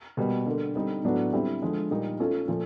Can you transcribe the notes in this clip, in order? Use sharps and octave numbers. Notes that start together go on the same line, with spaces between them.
B2 G3 A#3
D3 G3 A#3
D3 G3 C4 D#4
A2 F#3 B3 D4 F#4
D3 G3 C4 E4 G4
D3 F3 G#3
A#2 G3 A#3 D#4
A3 C#4 F4 A4
A#2 F3 A3